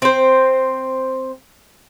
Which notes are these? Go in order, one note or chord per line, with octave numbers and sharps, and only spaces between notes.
C4 C5